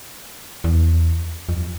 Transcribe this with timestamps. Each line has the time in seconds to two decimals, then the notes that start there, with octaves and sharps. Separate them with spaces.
0.64 E2
1.49 F2